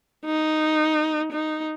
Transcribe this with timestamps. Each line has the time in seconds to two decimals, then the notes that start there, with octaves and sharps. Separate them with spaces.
0.25 D#4
1.31 D#4